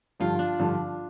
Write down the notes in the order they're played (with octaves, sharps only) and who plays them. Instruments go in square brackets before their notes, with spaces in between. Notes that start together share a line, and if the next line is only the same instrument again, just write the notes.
[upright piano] G2 D3 F3 [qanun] F4
[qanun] D4
[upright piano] G2 D3 F3